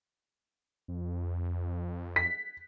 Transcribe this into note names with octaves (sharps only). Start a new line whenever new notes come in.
F2
B6